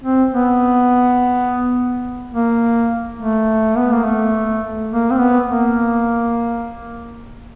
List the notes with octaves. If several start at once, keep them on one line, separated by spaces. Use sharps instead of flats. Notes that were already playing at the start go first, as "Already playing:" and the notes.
C4
B3
A#3
A3
B3
A#3
A3
A#3
C4
B3
A#3